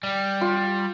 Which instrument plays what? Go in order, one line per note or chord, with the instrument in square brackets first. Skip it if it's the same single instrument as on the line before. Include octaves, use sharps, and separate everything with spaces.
[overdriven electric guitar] G3
[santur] F4